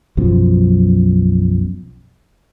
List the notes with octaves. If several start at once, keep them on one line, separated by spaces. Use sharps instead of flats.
B1 F#2 B2 F3